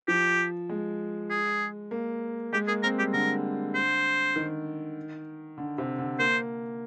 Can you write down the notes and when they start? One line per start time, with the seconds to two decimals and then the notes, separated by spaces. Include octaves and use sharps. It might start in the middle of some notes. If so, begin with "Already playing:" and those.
0.08 F3 G4
0.69 G#3
1.30 G#4
1.91 A#3
2.53 G#3 G4
2.68 A#3 G#4
2.83 C4 A#4
2.98 G3 G4
3.13 D3 A#4
3.75 C5
4.36 D#3
5.58 D3
5.78 C3
5.98 D3
6.19 A#3 C5